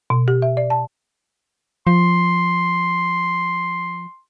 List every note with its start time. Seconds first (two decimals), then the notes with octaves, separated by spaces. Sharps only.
0.10 B2
0.28 G4
0.42 E5
0.57 D5
0.70 A5
1.87 F3 C6